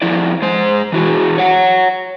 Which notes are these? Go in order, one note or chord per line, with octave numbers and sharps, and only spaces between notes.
F2 F3 E4 D5
G#3 C5
E3 E4 F#4 G#4
C#5 F#5